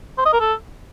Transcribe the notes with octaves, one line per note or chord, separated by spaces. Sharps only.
C5
D#5
A#4
A4